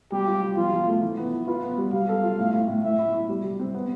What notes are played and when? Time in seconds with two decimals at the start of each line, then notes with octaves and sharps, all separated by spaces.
0.12 G3 G4
0.27 F4
0.42 G3
0.57 F3 F4
0.72 F3
0.88 A3
1.02 E3
1.17 B3
1.32 E4
1.47 F4 B4
1.63 B3
1.78 G3
1.93 G3 F5
2.09 A4
2.23 F4
2.39 A2
2.54 A2
2.68 A2
2.84 A2 E5
2.99 E4
3.14 E4
3.29 G3
3.44 G3
3.60 C4
3.74 B3